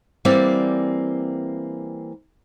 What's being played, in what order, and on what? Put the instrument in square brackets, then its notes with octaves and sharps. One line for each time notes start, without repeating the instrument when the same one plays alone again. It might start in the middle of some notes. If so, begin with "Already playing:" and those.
[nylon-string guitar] E3 G3 A#3 C4 D5